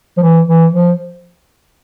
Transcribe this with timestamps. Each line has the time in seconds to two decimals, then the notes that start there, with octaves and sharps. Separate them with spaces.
0.18 F3
0.22 E3
0.48 E3
0.73 F3